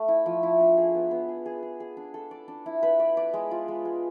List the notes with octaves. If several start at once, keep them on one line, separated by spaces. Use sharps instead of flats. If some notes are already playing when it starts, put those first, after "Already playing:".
Already playing: A3
E4
F3
E4
D4
G#4
B3
B3
G#4
G#4
G#4
G#4
D4
A4
D5
D4
E4
B4
D5
D5
G#3
F4
G#3
G#3